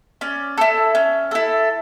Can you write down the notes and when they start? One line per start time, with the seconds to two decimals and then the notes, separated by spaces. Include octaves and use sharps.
0.21 C#4 D5
0.58 E4 A4
0.95 C#4
1.31 E4 A4